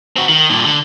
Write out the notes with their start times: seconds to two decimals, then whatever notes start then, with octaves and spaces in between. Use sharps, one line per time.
0.16 C4 F#4
0.29 D#3
0.50 G2 A#2
0.66 D3